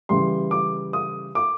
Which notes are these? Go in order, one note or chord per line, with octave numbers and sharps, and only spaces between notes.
C#3 E3 G3 C6
D6
D#6
D6